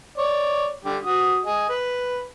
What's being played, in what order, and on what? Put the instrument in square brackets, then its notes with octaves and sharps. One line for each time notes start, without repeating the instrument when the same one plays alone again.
[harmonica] C#5 D5
D3 G3 G4
F#4 D#6
G#4 D#5
B4